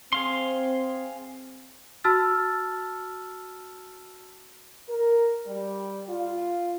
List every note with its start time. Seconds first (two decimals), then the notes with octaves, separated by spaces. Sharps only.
0.13 C4 G#4 F5 C6
2.04 F#4 A5 E6 F6 A6
4.89 A#4
5.46 G3
6.09 F4